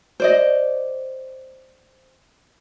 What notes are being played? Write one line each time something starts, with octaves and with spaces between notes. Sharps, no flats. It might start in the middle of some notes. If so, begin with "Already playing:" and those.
C5 D5 D#5